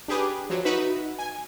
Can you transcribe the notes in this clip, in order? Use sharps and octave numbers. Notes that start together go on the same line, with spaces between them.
D4 G4 G#4 B4
F3 F#3
D#4 F#4 B4 E5
G#5